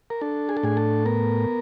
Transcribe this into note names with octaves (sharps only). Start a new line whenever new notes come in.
A#4
D4 A4
G#4
A4
A2 G#4
A4
B3 A#4